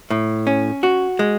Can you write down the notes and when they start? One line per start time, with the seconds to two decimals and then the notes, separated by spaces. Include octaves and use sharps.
0.10 A2
0.47 C#4
0.83 F#4
1.19 G#3